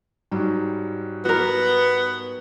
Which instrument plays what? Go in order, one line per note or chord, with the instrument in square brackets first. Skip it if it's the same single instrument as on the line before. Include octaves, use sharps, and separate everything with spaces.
[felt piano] G#2 F#3 G3
[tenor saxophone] B3 [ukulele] F#4 A#4